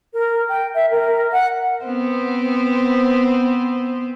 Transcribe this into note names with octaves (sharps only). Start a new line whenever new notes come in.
A#4
G5
E5
A#4
F#5
B3 C4 C5